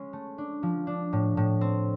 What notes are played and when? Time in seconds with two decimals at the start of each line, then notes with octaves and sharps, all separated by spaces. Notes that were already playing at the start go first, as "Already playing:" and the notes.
Already playing: G#3 C#4
0.13 A3
0.38 D4
0.63 F3
0.87 D4
1.13 A2
1.37 A2
1.61 C4